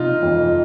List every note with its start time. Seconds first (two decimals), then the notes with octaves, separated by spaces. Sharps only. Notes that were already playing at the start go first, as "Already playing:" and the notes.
Already playing: C3 F3 D#4 F4
0.23 F2